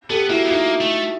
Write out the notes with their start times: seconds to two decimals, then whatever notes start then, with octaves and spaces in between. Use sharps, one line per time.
0.10 B3 G4 A4
0.30 A#3 E4 F#4
0.45 B3
0.50 A#3 D#4 F4
0.81 A3